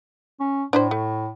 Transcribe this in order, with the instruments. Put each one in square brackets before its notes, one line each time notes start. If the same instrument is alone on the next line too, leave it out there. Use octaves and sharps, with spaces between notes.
[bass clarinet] C#4
[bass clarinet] A2 [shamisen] D4 E4 C5
[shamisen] A3